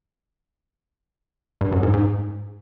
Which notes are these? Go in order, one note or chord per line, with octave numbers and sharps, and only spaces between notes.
G2
F#2
G#2
G#2